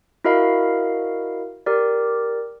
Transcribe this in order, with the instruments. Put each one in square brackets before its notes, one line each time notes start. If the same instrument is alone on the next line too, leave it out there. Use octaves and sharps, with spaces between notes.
[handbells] E4 F#4 A#4 D#5 F5 B5
G4 A#4 D5